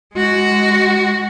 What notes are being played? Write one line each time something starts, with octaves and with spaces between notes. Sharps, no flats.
G#3 F#4